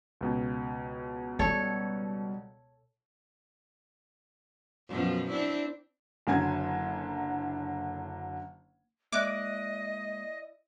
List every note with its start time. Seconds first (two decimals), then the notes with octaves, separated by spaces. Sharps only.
0.21 C#2 B2
1.39 G3 A4 C#5
4.88 F#2 B2 F3
5.30 C4 D4 E4
6.27 F#1 D3 F#3 G#5 G#6
9.12 G#3 A#3 E4 D5 D#5 D6 F#6